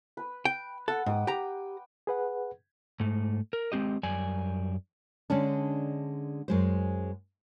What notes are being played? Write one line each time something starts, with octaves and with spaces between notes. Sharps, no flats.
B4
G5
A4 F#5
G#2 G5 D6 D#6
G4 G5 A#5
G#4 B4 F#5
G#2 A3
A#4
G#3 C4 G4 D#5
F#2 G3 D5 G#5
D3 G#3 C#4 D4
F#2 G#3 C5